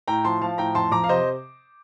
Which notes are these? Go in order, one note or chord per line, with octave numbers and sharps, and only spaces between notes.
A2 G5 A#5
F3 A5 C6
F3 F5 A5
A2 G5 A#5
F2 A5 C6
F2 A#5 D6
F5
C3 C5 D#5